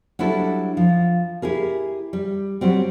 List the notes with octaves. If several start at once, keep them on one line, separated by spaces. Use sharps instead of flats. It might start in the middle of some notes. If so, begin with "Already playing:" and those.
F#3 G3 D4 E4 A4
F3
E4 G4 G#4 A#4
G3
F#3 G3 C4